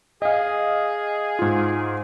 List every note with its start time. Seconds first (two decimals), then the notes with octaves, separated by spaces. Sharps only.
0.22 G#4 D#5 F5
1.39 G#2 F4